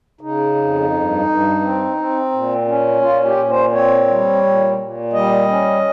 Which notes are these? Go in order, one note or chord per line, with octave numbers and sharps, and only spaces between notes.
C#3 D#4
F2
G2
G2
C4
C4
A#2
C#4
A#2 F4
G4
A#2
C5
C4 C#5
G3
A#2
A#2
G3 D#5
C#4